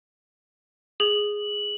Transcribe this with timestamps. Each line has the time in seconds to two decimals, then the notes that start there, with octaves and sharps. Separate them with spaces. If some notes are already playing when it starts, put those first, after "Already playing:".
1.00 G#4 F#7